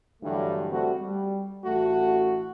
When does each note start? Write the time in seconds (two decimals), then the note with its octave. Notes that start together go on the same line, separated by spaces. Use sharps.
0.22 G2 D3 E3 F#3 G3 A3
0.71 G3 A3 C4 F#4
1.00 G3
1.64 A1 A3 F#4